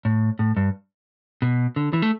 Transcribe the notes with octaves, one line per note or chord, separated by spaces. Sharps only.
A2
A2
G2
B2
D3
E3
A3